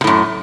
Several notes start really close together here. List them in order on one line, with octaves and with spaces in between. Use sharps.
C3 A2 F#2